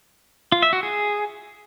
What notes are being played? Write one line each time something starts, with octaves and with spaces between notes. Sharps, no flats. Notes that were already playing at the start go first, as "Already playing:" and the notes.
F4
E5
F#4
G#4